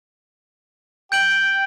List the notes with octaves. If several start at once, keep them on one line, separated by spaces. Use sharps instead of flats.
G5 G6 D7 F#7